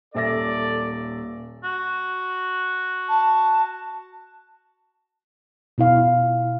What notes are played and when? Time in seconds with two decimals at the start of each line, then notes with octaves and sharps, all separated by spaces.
0.15 D#1 A4 D5 E5 A#6
1.64 F#4
3.09 A5
5.78 B2 E4 F5